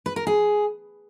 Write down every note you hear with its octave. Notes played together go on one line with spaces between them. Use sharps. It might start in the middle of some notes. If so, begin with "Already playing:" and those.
B4
A#4
G#4